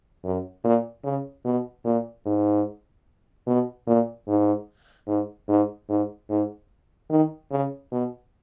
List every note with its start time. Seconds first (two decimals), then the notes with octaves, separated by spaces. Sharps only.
0.24 F#2
0.64 A#2
1.04 C#3
1.45 B2
1.85 A#2
2.26 G#2
3.47 B2
3.87 A#2
4.28 G#2
5.08 G#2
5.49 G#2
5.89 G#2
6.30 G#2
7.10 D#3
7.51 C#3
7.92 B2